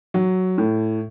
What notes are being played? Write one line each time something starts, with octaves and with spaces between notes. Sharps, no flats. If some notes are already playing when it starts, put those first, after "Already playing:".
F#3
A2